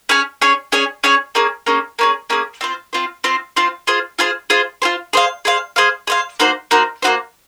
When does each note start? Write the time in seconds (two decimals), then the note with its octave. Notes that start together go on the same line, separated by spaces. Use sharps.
0.09 C#4 G#4 C#5 G#5
0.41 C#4 G#4 C#5 G#5
0.72 C#4 G#4 C#5 G#5
1.04 C#4 G#4 C#5 G#5
1.35 A#3 C#4 G#4
1.66 A#3 C#4 G#4
1.99 A#3 C#4 G#4
2.30 A#3 C#4 G#4
2.61 C4 F4 C5
2.93 C4 F4 C5
3.24 C4 F4 C5
3.56 C4 F4 C5
3.87 F4 G#4 C5
4.19 F4 G#4 C5
4.50 F4 G#4 C5
4.82 F4 G#4 C5
5.13 G#4 C5 F5
5.45 G#4 C5 F5
5.76 G#4 C5 F5
6.07 G#4 C5 F5
6.40 A#3 D#4 F#4 C5
6.71 A#3 D#4 F#4 C5
7.02 A#3 D#4 F#4 C5